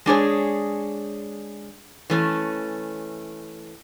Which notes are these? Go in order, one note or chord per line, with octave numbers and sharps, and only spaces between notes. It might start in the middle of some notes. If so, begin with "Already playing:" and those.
G#3 D4 G#4 C#5
E3 A3 C#4